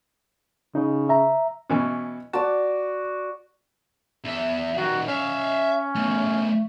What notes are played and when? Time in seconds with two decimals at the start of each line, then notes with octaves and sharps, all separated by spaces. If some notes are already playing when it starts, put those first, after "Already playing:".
0.75 C#3 D#4
1.09 E5 A#5
1.70 B2 E3 C#4
2.33 F#4 D5 A5
4.25 E2 E5
4.77 D#3 G3 F#4
5.08 C#4 E5 F5
5.95 A3 B3